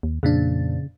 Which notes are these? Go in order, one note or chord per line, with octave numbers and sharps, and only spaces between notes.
D#2
F2 A#2 C#3 D4